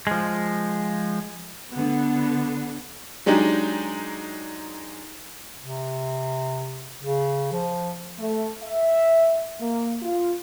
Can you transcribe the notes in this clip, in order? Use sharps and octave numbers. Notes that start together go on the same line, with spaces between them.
F3 G#3
D3 B3
F#3 G#3 D4 D#4 G4
C3
C#3
F3
A3
E5
A#3
F4